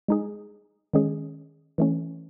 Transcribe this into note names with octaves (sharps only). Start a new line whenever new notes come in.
G#3 D#4 G#4
D#3 G#3 C#4 G#4
E3 A3 C#4